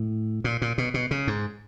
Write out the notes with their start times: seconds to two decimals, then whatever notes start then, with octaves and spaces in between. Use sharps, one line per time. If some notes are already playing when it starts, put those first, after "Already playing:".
Already playing: A2
0.44 A#2
0.62 A#2
0.78 B2
0.94 B2
1.11 C#3
1.27 G#2